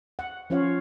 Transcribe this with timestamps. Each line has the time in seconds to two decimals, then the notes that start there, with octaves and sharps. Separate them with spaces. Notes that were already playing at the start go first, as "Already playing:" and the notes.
0.19 F#5
0.50 F3 C#4 F4 C#5 F5